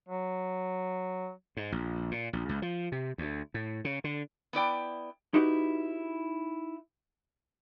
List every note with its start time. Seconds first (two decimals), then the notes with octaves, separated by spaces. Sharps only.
0.08 F#3
1.57 G#2
1.72 A#1
2.11 A#2
2.33 A#1
2.49 C#2
2.62 F3
2.92 C3
3.18 D2
3.54 A2
3.85 C#3
4.04 D3
4.53 B3 E4 D5 G5
5.34 D#4 E4 F#4 G4 B4